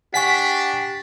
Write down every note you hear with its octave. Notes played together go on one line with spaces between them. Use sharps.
D4 G4 F#5 G#5 C#6 B6